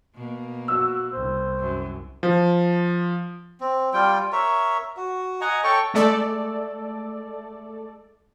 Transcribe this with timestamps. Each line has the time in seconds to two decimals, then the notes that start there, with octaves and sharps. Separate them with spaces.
0.14 B2 A#3
0.68 F#4 E6
1.12 C2 C5
1.59 F#2
2.23 F3
3.60 C4
3.94 G3 F4 G5
4.32 A#4 C#5 E5
4.97 F#4
5.41 D#5 F#5 G#5 A#5
5.64 A4 C#5 G5 C#6
5.94 G#3 A3 A4 D5